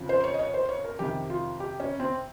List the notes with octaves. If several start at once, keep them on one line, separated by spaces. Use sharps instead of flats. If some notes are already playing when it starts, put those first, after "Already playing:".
Already playing: F2 C#3 F3
C5
C#5
D#5
C#5
C5
C#5
A#4
F2 C3 D#3 G4
F4
G4
C#4
C4